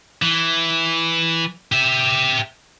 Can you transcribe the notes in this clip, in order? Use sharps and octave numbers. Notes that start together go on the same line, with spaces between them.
E3
G4 E5